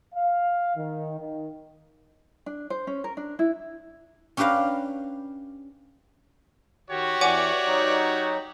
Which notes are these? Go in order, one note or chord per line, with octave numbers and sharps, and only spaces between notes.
F5
D#3
D#3
D4
C5
C#4
A#4
D4
E4
C#4 D4 G4 B4 F5 A#5
D#3 F#4 G4 C#5
E2 E3 D5 F#5 G#5 D6
F#3 D#4